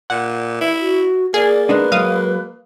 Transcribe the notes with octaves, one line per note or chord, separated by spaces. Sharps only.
A#2 F#5
E4
F#4
A#3 G#4 D5
G#3 D4 D#4 B4
F#3 G#3 F5 D#6